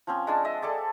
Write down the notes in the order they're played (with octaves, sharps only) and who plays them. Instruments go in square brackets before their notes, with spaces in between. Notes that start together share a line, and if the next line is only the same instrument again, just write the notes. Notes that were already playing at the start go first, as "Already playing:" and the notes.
[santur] F3 C4 C#4
G#3 D4 A5
D#5 E5
G#4 A4 D5 A5